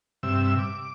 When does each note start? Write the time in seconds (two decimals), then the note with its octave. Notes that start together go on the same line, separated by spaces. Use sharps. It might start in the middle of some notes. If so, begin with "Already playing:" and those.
0.23 G2 C3 E5 E6
0.59 D6